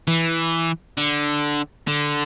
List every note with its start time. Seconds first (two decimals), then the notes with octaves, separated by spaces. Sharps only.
0.08 E3
0.98 D3
1.88 D3